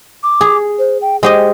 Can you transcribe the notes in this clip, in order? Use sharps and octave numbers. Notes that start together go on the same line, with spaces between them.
D6
G#4
C5
G5
G#3 G4 C5 D#5